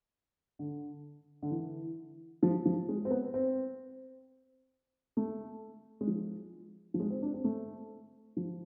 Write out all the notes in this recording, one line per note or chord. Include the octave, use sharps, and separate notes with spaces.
D3
D3
E3
F3
F3
G#3
C4
B3
C4
A3
G#3
F3
F3
G#3
C4
D4
C4
A3
F3